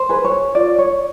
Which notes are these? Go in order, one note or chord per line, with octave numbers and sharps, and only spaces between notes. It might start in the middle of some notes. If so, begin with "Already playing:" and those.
Already playing: C5
G#4 B4
C#5
F4 D5
C#5